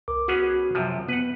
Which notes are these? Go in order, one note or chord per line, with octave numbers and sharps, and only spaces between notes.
C2 A#4 D6
B3 C#4 F#4 G#4
F#2 C3 F3
B3 B4 F#5